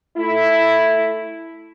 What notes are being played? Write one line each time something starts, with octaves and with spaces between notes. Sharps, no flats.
A3 E4